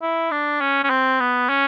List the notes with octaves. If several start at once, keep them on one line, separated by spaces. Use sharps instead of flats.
E4
D4
C#4
C#4
C4
B3
C#4